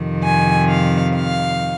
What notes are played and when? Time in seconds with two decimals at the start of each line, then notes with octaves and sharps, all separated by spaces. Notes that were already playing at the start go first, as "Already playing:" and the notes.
Already playing: F2 C3 D#3
0.23 G#5
0.70 F5
1.15 F5